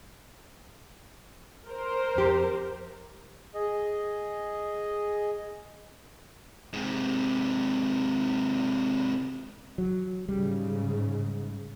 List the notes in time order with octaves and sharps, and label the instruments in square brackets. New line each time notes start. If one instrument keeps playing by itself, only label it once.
[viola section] A#4 C5
[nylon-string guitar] F2 G4
[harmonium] G#4 D#5
[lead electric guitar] G#2 C3
[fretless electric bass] F#3
[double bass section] G#2 C#3 [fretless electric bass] G3